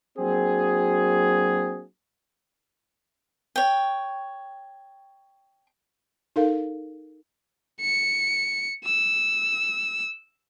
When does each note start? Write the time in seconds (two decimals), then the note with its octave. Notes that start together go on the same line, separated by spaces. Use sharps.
0.18 F#3 A#3 C4 D4 F#4 G#4
3.56 C#5 G5
6.36 D#4 A4 A#4 F5
7.81 C#7
8.85 E6